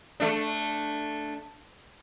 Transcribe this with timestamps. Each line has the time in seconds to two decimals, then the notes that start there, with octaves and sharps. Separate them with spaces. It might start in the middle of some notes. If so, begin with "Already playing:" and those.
0.20 A3 D4